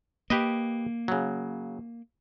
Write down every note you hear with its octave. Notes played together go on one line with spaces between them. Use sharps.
A#3 G4 B4 D#5
C#3 F#3